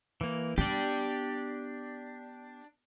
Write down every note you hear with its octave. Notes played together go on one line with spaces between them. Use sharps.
E3 A#3
B3 D4 G4 D5